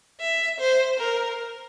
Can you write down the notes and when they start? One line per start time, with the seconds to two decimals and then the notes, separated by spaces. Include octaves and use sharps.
0.21 E5
0.60 C5
1.00 A#4